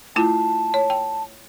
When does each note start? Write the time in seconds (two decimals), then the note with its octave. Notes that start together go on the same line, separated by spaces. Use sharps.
0.16 A3 E4 F4 A5
0.74 C#5
0.90 G5